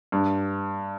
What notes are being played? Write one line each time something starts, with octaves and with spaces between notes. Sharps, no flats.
G2